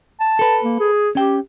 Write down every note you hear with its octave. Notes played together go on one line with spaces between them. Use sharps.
A5
A4 B4
A#3
G#4
C#4 G4 G5